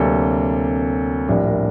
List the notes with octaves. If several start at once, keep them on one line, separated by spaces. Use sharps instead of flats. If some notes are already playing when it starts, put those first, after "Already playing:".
Already playing: D2 C3 F#3 A#3 D4 A4
A#1 A2 G3 D4 A#4
A#4